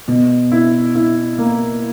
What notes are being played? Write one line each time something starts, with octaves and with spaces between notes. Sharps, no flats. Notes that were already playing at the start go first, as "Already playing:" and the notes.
B2
E4
E4
A#3